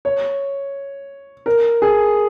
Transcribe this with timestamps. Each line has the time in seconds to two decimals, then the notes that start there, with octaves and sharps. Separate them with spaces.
0.05 C#5
1.46 A#4
1.82 G#4